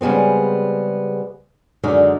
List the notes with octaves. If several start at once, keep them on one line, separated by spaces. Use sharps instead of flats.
C#3 G3 G#3 B3 C4
F#2 D3 D#3 G#3 D#4 D5